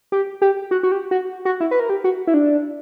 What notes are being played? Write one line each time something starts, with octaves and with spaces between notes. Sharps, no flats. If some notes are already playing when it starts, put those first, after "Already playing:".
G4
G4
F#4
F#4
G4
F#4
F#4
E4
B4
A#4
G4
F#4
E4
D4